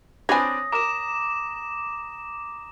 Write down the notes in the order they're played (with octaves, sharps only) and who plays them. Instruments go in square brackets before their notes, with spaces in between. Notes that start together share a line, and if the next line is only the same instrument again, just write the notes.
[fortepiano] C4 D4 B4 [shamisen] C#5 G#5 [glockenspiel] D#6 A#6
[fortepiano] A#4 [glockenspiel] A#5 [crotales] D6 E7